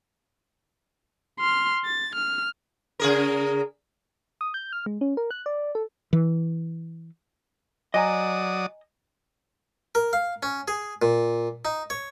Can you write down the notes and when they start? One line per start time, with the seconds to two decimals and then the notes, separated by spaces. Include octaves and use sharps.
1.39 C6 F6
1.85 A6
2.15 F6
2.99 C#3 G#4 A#4
4.41 D#6
4.54 G6
4.73 F6
4.86 G#3
5.01 C#4
5.17 A#4
5.31 F#6
5.46 D5
5.75 A4
6.13 E3
7.94 F#3 D5 D#5 G#5 A#5 D#6
9.95 A#4
10.13 F5
10.43 C#4
10.68 G#4
11.02 A#2
11.65 D#4
11.90 C#5